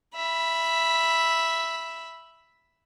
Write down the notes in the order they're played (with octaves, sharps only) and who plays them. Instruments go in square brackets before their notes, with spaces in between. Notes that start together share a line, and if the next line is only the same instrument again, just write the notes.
[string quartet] E5 B5